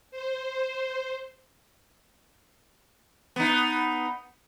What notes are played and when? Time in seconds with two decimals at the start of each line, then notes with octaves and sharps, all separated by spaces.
0.11 C5
3.36 B3 D#4